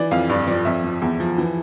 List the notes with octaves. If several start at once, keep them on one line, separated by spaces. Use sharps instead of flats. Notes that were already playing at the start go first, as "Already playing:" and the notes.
Already playing: E3 D5
F2 F5
G2 D5
F3 D5
F2 E5
F3
E2
F3
E3